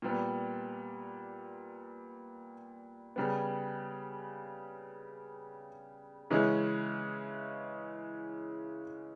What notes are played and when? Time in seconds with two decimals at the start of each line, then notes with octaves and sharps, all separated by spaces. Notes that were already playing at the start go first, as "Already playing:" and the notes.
0.02 A#2 G3 B3
3.16 C#3 G3 B3
6.30 C#3 E3 G#3 C#4